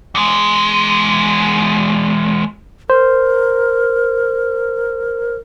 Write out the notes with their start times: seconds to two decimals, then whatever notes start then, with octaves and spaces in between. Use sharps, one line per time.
0.15 E2 G#3
2.90 A#4 C5